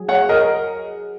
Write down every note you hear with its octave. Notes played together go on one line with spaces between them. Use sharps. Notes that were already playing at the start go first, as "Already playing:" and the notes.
Already playing: F#3 G#4
C#5 F#5
A#4 D#5